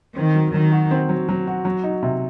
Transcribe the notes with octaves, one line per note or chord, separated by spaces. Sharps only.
D#3 C4
F#3
D#3 F#3
F#4
C4
F#3
F#3
F#4
F#3
D#4
C3